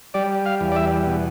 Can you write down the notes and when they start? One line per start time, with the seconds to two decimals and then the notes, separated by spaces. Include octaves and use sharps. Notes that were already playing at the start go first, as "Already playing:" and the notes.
0.14 G3 D5
0.46 F5
0.61 E2
0.72 D5
0.76 E5
1.07 B2